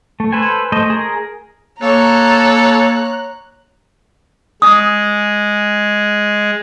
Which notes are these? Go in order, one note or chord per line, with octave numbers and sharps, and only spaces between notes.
A3
A4 B4 C5 G#5
A3 C5 D#5
G#4 A#4
A#3 A4 C#5 A#5 F#6
G#3 D#6